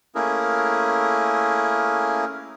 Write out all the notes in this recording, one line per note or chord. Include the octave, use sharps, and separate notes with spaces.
A3 A#3 C#4 E4 G#4 A#4